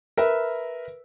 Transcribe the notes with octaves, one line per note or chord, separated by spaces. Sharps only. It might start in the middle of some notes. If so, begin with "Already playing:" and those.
A#4 B4 E5